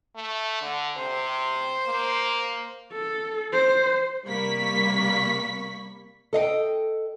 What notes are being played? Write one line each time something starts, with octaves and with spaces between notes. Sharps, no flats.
A3
D3
C3 C5
A#3
A4
C5
C3 G3 A#3 B5 C#6 B6
A4 D#5 F5 G5